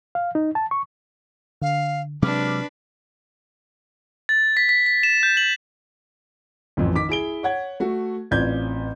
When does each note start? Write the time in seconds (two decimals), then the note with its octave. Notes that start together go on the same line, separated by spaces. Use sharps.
0.15 F5
0.35 D#4
0.55 A5
0.71 C#6
1.62 D3 F5
2.22 C3 F#3 G#3 D4 B4 D6 F6
4.29 A6
4.57 B6
4.69 B6
4.86 B6
5.03 E7
5.23 G6
5.37 F#7
6.77 A1 F2 E3
6.95 D#3 D6 B6
7.09 E4 G#4 D7 G7
7.43 C#5 F#5 G#6
7.80 A3 F#4
8.31 A1 C4 F4 D5 G6 G#6